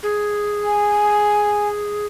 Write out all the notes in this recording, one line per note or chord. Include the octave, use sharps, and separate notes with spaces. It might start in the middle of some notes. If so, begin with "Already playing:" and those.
G#4
G#5